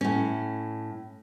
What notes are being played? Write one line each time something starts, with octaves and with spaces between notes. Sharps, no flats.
A2 C#4